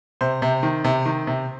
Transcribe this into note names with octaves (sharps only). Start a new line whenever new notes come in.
C3 C5
C3
D#3
C3
D#3
C3